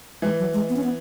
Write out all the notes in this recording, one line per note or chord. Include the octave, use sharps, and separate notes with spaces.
E3 G#3
F#3
G#3
B3
C#4
B3